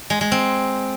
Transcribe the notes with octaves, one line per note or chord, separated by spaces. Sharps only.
G#3
G#3
C4